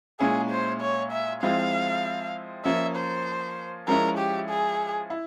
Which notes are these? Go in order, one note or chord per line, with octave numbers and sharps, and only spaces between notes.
A#2 G#3 C#4 E4 G#4
C5
C#5
E5
F3 G#3 C4 E4 F5
F3 A#3 C#4 E5
C5
F3 G#3 C#4 E4 A#4
G4
G#4
E4